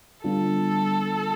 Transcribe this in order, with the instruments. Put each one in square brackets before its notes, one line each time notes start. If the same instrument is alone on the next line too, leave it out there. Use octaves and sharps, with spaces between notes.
[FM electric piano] D3 G3 B3 D4 F4 [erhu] A4